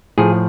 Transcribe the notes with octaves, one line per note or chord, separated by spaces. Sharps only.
A2 F3 G#4